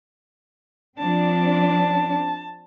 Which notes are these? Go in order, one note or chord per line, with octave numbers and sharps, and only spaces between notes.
F3 C4 D4 A5